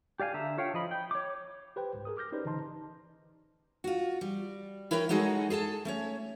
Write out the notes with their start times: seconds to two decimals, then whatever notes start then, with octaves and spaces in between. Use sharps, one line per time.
0.20 G4 D5 F5 G#5
0.34 D3 E5 A5 A#5
0.58 F4 C#5 F5 G5
0.74 F3 D#5 B5
0.91 G5
1.11 C#5 D6
1.76 G4 B4 C5 G5
1.93 C2 G#2
2.05 G#4 A#4 D#6
2.17 D6 F6 G6 A#6
2.32 C#4 D#4 G4 B4 C5 D5
2.44 A#1 D3 E3 D#4 A5 C6
3.84 F4 F#4
4.21 G3
4.91 E4 A#4 B4 C#5 G5
5.09 F#3 G#3 D#4 F#4 G#4 A4
5.50 G#4 A4 G#5 A5
5.85 A3 C#4 C#5